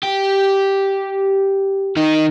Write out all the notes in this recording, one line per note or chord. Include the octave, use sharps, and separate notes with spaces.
G4
D#3 D#4